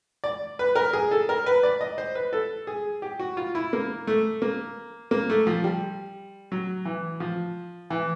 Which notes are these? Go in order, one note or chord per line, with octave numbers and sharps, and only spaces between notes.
D5
B4
A#4
G#4
A4
A#4
B4
D5
D#5
C5
B4
A4
G#4
G4
F#4
F4
E4
A#3
A3
A#3
A#3
A3
F3
G3
F#3
E3
F3
E3